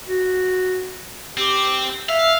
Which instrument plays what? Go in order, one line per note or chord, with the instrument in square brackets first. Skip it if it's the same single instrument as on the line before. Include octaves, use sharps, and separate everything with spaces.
[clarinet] F#4
[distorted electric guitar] C4 [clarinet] G4
[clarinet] E5 [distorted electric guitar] F5